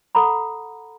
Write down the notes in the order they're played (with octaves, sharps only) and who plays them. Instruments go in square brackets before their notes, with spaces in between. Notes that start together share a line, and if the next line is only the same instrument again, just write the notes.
[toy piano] A4 F#5 A#5 B5